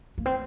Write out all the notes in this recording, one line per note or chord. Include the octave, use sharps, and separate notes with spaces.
A#3
C4